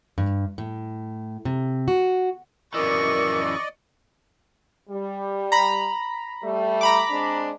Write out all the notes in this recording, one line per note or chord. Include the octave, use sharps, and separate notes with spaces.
G2
A2
C3
F#4
F#2 E3 A#4 D5 D#5 C#6
G3
A#5 B5
G3 A3
A#5 B5 D6
G#3 C4 D4